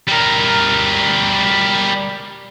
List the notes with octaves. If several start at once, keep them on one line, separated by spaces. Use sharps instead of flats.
G3 A#4